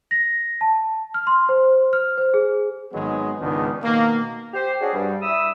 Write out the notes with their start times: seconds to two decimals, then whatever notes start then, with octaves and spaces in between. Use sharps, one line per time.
0.11 A#6
0.61 A5
1.14 F6
1.27 C6
1.49 C5
1.93 F6
2.18 C5
2.34 G#4
2.93 G#1 D#3 F#3 G#3 B3
3.39 C#2 G#2 D#3 B3 D4
3.83 B2 D#3 A#3
4.54 G4 C5
4.80 C#4 D4 F#4 G#4
4.94 G2 G3
5.22 E4 E5 B5 D#6 E6